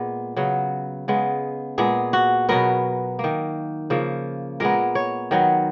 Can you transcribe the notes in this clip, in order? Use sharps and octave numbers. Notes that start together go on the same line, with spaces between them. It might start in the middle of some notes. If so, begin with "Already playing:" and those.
Already playing: A#2 G#3 B3
C#3 F#3 B3
C#3 G#3 B3
A#2 G#3 B3 G#4
F#4
B2 F#3 B3 A#4
D#3 A#3
C#3 F3 A#3
A#2 G#3 B3 A#4
C#5
D#3 F#3 B3